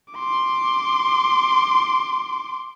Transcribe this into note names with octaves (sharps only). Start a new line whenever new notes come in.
C6 D6